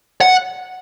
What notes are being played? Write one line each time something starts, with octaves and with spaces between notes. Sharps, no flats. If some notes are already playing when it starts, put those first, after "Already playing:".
F#5